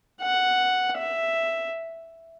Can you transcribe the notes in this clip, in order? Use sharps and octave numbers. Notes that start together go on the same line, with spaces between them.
F#5
E5